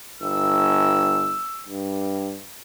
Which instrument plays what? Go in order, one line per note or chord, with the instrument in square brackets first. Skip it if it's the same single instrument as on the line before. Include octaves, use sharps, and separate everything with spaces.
[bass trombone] G1 [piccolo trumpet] E6
[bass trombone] G2